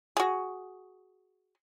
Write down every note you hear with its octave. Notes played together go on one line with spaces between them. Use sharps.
F#4 G#4